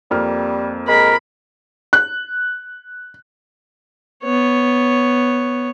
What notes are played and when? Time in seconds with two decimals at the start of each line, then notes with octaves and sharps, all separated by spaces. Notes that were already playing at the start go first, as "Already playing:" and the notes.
0.11 F2 G3 A#3 F6
0.88 G#3 A#4 B5
1.93 F#6
4.24 B3 C#5